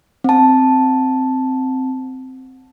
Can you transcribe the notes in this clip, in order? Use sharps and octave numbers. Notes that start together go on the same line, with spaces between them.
C4 A5